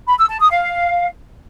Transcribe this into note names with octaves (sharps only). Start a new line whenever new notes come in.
B5
E6
A5
D#6
F5